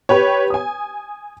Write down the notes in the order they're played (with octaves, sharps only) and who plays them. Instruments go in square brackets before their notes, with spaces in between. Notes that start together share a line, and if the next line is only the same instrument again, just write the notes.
[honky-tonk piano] G4 B4 C#5
G#5 D#6